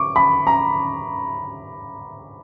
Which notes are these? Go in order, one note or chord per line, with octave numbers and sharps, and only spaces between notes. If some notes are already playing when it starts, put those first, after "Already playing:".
Already playing: C#6 D6
B5
A#5